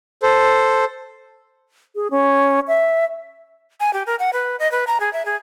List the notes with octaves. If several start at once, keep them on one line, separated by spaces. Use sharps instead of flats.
A4 C5
G#4
C#4
E5
G#5
G4
A#4
F#5
B4
D#5
B4
A#5
G#4
E5
G#4